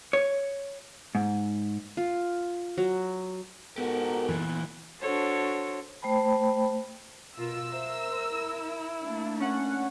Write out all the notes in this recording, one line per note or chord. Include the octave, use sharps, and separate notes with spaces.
C#5
G#2
F4
F#3
G#2 B3 F#4 G4 A4 A#4
E2 A#2 E3
D4 F#4 A4 C5 C#5
A3 C5 G5 A5 B5
B2 F4 A#4 E6
A#4 C5 E5
E4
A3 A#3 D4
C#4 F#5